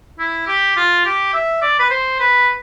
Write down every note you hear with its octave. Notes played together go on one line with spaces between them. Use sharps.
E4
G4
F4
G4
E5
D5
B4
C5
B4